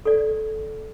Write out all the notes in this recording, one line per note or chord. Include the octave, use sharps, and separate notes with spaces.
A4 D5